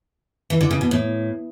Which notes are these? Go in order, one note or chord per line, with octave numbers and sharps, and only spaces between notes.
E3
D3
C#3
B2
A2